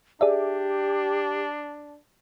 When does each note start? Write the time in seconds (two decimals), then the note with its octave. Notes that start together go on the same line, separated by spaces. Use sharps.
0.21 D4 G4 G#4 D5 E5